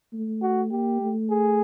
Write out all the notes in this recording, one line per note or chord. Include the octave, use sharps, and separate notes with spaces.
A3
F#4
A#3 G4
A3
G#4